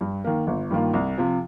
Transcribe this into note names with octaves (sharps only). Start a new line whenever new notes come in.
G2
D#3 A#3
G1
G2 D#3 A#3 F4
C2
C3 F3